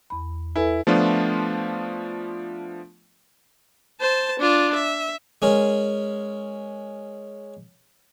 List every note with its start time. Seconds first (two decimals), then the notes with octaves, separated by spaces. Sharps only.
0.10 E2 B5
0.56 E4 A4 B4 G#5
0.87 F3 A3 B3 D4 F4
4.01 C5 A5
4.40 D4 F4
4.75 E5
5.42 G#3 C#4 A#4